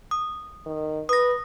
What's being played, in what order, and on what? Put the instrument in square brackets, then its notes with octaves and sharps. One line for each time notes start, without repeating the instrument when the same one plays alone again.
[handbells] D#6
[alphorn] D#3
[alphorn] B4 [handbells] D#6 A#6